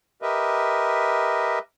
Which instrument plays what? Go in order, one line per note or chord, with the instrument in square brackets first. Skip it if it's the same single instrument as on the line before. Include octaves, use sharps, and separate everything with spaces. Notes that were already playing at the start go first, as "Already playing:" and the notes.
[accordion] G4 A#4 B4 D#5 E5